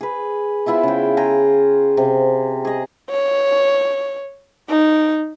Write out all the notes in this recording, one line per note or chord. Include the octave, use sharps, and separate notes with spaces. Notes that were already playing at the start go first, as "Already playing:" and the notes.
G#4 B4
B3 E4 F4 E5
C#3 G5
F4 G#4 G5 A#5
C3
G#4 D#5
C#5
D#4